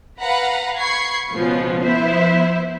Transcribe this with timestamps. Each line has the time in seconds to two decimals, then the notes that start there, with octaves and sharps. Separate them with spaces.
0.20 B4 F5 F#5 A#5 B5
0.78 B5 C#6 G#6 C7
1.32 C#2 B2 F3 B3 C#4
1.84 F3 B3 E4 C5 E5